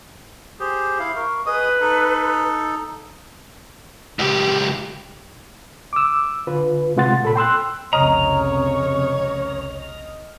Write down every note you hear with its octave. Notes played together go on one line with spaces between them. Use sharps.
G4 G#4 C5
E4 F5
A#4 C#6
G#4 B4 D#5 D#6
D#4 A4
C#2 G4
D6 E6
D3 F4 B4
C3 G#3 F4 F#5 C6 A6
A#2 A4 B5
G5 C6 E6 F#6
F1 C2 C#3 C#5 D#5 A#5 D#6 F6